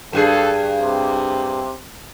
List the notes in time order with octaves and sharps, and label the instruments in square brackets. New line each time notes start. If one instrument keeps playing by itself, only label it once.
[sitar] G2 F#4 G#4 [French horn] A4
[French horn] C3